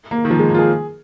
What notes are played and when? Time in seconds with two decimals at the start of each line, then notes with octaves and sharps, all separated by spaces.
0.11 A#3
0.25 D#3
0.30 F3
0.39 G#3
0.49 A#3
0.55 F4
0.59 G#4